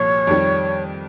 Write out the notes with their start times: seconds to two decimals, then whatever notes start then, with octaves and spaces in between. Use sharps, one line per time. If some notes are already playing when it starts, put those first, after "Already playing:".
Already playing: C2 A#2 F3 C#5
0.27 F2 D#3 G3